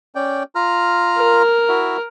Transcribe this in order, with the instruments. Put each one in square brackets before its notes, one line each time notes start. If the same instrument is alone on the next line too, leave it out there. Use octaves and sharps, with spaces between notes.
[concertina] C#4 D5 G5
F4 A#5 F6
[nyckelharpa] A#4
[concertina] E4 F#4 E5